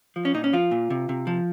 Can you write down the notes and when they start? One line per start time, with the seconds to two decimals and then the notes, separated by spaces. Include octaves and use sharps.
0.16 F3
0.25 C#4
0.34 A#2 D#4
0.44 C#4
0.53 F3 F4
0.71 A#2
0.90 C3
1.09 C3
1.27 F3